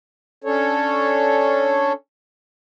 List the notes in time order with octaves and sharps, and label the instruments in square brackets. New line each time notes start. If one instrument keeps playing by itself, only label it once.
[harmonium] C#4 D4 A4 C#5